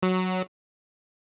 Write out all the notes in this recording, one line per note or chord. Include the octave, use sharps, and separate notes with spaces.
F#3